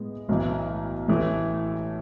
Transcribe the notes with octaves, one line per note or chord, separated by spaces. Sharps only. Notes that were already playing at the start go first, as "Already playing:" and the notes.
Already playing: A2 G#3 B3
B1 A2 E3
A1 A2 E3 A3